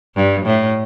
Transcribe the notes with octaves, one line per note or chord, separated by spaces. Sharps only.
G2
A2